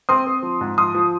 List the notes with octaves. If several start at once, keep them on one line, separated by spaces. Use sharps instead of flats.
C4 C6 D#6
C4
F3
G#2
F3 C6 D#6
F3